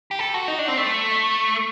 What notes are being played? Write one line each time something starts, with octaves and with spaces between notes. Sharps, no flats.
G4
A4
F#4
D#4
D4
C4
A3